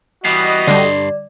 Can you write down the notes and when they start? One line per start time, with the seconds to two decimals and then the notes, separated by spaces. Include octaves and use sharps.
0.25 E3 G3 B3 F#4 D#5 C7
0.67 G2 D3 G3 D5 C6